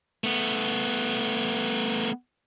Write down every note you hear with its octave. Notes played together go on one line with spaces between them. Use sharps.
A3 B3